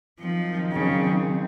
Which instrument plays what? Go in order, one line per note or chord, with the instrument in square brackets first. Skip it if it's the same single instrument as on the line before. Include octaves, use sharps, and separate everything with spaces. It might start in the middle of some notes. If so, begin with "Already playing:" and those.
[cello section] D#3 F#3 C4 D#4 [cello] F3
[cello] C#3